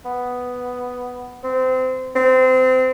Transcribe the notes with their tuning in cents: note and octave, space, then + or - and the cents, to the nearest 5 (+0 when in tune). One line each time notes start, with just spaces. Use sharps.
B3 +5
C4 -25
C4 -25